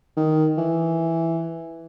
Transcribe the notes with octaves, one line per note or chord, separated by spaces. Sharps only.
D#3
E3